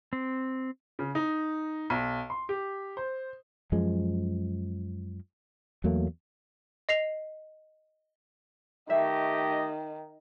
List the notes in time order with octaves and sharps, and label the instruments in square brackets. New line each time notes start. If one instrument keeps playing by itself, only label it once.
[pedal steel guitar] C4
[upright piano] C#3
D#4
B1
C6
G4
C5
[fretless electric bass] F#2 F3 G#3
E2 F#3 A3 A#3
[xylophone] D#5 C7 F7
[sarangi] D#3 [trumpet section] A3 G4 D#5 [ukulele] E5